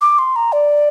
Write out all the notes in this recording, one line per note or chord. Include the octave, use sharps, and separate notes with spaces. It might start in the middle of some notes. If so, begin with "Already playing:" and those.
D6
C6
A#5
D5